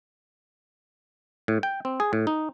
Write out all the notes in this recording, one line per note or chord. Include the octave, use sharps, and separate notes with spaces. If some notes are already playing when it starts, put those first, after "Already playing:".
A2
G5
C4
G#4
A2
D#4